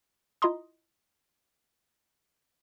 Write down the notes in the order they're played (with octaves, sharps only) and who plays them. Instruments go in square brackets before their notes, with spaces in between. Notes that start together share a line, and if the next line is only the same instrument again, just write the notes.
[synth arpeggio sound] E4 F4 D#5 A#5 C6 D#6